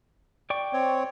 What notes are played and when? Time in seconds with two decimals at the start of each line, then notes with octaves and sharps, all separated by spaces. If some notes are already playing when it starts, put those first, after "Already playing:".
0.50 D5 G5 C#6
0.73 C4 C#5